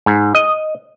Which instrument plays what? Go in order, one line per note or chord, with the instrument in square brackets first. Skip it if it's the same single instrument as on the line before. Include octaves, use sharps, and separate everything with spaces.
[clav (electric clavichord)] G#2
D#5